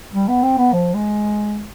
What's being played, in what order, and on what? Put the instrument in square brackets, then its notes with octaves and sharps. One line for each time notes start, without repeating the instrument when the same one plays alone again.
[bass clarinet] G3
B3
C4
B3
F3
G#3